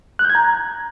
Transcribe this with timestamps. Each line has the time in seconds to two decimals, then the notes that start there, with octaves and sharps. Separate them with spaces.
0.19 F#6
0.24 G6
0.30 G#6
0.35 A#5